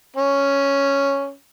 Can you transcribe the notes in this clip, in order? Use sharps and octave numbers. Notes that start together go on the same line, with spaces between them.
C#4